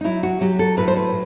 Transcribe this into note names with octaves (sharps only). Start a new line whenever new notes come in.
D#4
F#3 E4
F#4
F#3 G4
A4
A2 B4
C5
B4